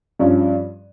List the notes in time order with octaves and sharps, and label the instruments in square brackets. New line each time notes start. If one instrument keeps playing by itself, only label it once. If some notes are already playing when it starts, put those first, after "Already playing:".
[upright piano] G2 F3 C#4